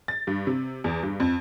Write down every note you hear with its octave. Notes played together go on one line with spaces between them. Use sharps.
A6
G2
C3
E2
G2
F2